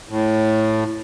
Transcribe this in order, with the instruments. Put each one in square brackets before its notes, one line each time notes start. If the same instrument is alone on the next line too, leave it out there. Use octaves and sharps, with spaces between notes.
[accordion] A2